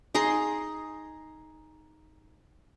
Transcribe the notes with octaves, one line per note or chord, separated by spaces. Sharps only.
D#4 G#4 A#5 C6